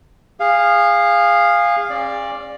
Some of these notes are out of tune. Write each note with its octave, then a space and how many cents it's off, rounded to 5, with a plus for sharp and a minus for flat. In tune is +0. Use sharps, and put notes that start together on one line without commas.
G#4 -25 F5 +0
C#4 -40 D5 +0